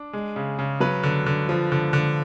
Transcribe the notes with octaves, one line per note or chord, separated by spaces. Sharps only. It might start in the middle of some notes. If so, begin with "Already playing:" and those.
Already playing: D4
G#3
C#3
C#3
F#3 B4
D3
D3
F3
D3
D3